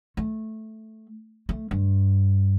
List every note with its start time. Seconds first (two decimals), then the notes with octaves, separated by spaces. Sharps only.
0.17 A3
1.49 A3
1.71 G2